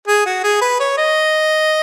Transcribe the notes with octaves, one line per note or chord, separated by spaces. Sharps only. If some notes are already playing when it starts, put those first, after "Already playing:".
G#4
F#4
G#4
B4
C#5
D#5